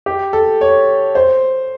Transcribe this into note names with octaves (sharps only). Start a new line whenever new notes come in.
G4
A4
C#5
C5